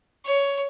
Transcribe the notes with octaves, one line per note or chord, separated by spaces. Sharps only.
C#5